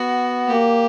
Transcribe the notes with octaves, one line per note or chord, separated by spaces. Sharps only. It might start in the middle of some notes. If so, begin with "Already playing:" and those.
Already playing: B3 F#4
A#3 G4